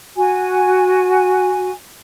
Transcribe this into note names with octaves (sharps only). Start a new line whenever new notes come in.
F#4 G#5